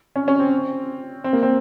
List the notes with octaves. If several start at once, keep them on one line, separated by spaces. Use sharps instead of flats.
C#4
C#4
C4
C4
A#3
C4